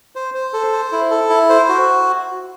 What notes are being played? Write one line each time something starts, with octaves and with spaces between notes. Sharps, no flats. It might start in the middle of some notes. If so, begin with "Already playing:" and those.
C5
C5
A4
C5
E4
A4
E4
C5
F#4